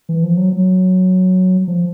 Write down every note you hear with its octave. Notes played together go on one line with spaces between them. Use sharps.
E3
F3
F#3
F#3
F3